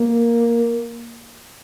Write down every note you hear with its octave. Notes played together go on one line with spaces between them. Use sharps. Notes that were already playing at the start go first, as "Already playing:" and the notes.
Already playing: A#3